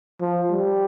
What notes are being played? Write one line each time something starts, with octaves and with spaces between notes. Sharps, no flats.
F3
G3